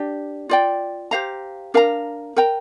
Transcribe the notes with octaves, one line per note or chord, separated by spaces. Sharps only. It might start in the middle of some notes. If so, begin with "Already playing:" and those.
Already playing: D4 G4 D5
F4 D5 G5
G4 C5 F5 A#5
D4 A#4 F5 A#5
A#4 G5 A#5